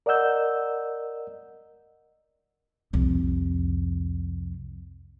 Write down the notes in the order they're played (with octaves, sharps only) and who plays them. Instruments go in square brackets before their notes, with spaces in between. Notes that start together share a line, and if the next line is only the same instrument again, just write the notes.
[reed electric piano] A#4 D5 D#5 F#5 E6 G6
[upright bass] C2 F2